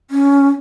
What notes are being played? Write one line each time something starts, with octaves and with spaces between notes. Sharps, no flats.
C#4